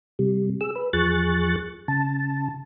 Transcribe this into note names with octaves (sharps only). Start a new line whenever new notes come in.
C3 G3
G#4 E6
B4
E2 F3 G#4 C#6 F#6 A6
C#3 A5